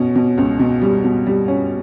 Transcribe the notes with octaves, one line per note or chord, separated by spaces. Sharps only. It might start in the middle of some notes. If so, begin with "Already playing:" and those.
Already playing: B2 C#4
B2
C#2
B2
G3
B2
G3
C#4